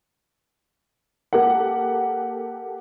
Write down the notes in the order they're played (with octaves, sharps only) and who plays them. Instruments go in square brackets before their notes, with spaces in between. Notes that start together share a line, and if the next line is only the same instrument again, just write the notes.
[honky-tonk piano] A#3 G4 A4 A#4 F#5